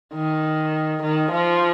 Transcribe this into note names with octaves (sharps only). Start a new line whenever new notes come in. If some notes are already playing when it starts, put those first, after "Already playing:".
D#3
D#3
F3